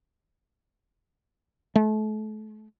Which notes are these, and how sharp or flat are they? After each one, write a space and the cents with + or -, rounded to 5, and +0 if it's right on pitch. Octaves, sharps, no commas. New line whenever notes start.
A3 -35